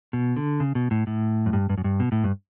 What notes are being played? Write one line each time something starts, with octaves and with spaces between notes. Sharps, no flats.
B2
D3
C#3
B2
A2
A2
F#2
G2
G2
F#2
G2
B2
A2
G2